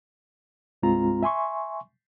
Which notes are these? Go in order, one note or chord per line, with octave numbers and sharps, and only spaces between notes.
C2 G2 G#3 C4 F4 A#5
E5 G#5 C6 C#6